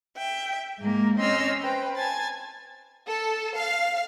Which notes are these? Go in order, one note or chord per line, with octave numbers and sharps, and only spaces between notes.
E5 G5
G#2 G#3 A#3
C4 C#4 D#5 C6 E6 F6
B4 C5 G5
G#5 A5 A6
A4
F5